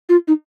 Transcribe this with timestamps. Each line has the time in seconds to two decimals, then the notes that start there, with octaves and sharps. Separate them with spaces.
0.09 F4
0.28 D#4